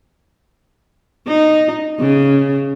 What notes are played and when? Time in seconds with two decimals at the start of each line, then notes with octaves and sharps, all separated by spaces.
1.27 D#4
1.99 C#3